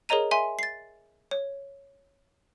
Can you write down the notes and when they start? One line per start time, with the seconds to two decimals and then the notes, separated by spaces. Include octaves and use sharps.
0.09 G#4 A#4 C#5 D#5 A#5 D#7
0.31 E5 G#5 C6
0.59 A6 C7
1.31 C#5